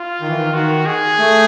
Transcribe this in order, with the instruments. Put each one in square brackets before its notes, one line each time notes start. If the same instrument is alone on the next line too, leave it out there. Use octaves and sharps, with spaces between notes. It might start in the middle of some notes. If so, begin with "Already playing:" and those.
Already playing: [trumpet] F4
[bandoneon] D#3
E3
D#3
[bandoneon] D#3 [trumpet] F#4
[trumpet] G#4
[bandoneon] A3